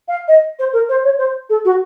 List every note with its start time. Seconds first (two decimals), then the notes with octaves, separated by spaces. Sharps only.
0.08 F5
0.28 D#5
0.59 C5
0.73 A#4
0.89 C5
1.04 C#5
1.18 C5
1.49 A4
1.65 F#4